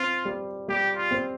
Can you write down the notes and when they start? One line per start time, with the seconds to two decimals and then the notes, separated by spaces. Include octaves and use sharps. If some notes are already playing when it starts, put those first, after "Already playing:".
Already playing: C4 F4
0.25 G3
0.68 G3 G4
0.96 F4
1.11 C4